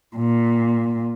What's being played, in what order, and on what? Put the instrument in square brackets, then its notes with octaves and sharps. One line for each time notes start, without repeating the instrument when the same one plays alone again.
[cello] A#2